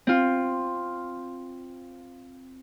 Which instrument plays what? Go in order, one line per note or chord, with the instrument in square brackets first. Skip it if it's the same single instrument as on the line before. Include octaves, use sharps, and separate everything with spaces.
[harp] C4 F4